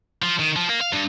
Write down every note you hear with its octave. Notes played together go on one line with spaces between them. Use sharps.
F3
D#3
F3
A#3
F5
G2